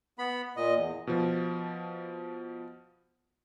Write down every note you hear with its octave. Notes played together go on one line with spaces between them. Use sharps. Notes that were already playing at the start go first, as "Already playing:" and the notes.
B3 B5
A#2 D#5
E2
B2 F3